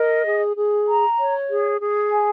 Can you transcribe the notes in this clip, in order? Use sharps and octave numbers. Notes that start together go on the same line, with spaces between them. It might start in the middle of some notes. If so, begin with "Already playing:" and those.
Already playing: A#4 D#5
G#4
G#4
A#5
C#5
G#4
G#4
G#5